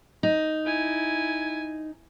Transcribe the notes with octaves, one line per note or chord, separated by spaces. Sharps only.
D#4
E4 G#5